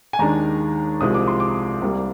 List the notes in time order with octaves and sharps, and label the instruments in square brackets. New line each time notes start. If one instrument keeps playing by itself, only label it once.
[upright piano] G#5
D#2 D#3 G#3 D4 A#5
C2 C3 F3 G#3 C4 D#6
D6
C6
D6
C2 C3 G3 A#3